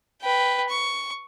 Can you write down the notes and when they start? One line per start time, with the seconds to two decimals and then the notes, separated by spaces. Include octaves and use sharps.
0.21 B4 G5
0.69 C#6